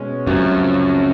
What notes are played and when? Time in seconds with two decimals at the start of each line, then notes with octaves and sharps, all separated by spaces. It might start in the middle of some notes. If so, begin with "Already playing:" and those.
Already playing: B2 G#3 C#4
0.27 C#2 F#2 C3 F3 A3 C#4